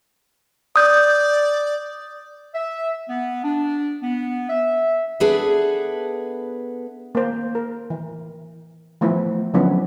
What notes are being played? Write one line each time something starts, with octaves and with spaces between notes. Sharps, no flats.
D5 D#6 G6
E5
B3
D4
B3
E5
B3 D4 G#4 A4 B4 E5
A#3 C5
A#4
E3
E3 F3 A3 B3 E4 B4
D3 F3 F#3 B3 C#4 E4